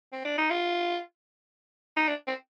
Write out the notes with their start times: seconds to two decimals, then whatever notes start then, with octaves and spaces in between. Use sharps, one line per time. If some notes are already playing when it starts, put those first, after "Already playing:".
0.12 C4
0.25 D4
0.38 D#4
0.50 F4
1.97 D#4
2.08 D4
2.27 C4